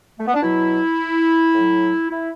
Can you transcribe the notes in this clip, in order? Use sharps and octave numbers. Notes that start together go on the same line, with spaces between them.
A3
B3
D4
B2 F#3 E4
A2 F#3
E4